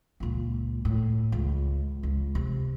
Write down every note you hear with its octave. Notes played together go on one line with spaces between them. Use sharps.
C#2 A#2
A2
C#2
C#2
C3